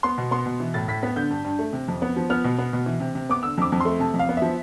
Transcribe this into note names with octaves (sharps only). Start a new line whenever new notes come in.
B3 C6
B2
B3 C6
B2
E3
A2 A6
A2 B6
B3 B6
D3 G6
G2
G2
A3
C3
F2
B3
F3
B3 F6
B2
B3
B2
E3
C3
C3
B3 D6
D3 E6
F2 D6
F2
A3 C6
C3 A5
F2
F5
B3
F3 E5